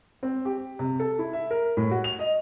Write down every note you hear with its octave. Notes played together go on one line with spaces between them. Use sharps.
C4
G4
C3
A4
E4
E5
A#4
A2
F#4
F7
D#5